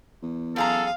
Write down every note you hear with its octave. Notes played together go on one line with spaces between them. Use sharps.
E2
F#2 G#4 A4 F5 A#5